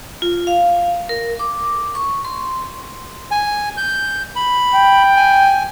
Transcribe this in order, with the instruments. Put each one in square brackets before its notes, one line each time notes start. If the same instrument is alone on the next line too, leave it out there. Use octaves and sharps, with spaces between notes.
[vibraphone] F4
F5
A#4
D6
C#6
C6
[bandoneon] G#5
G6
B5
[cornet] G5
[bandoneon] G#5